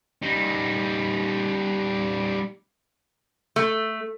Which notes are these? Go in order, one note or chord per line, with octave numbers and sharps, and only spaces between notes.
G3 D#4
A3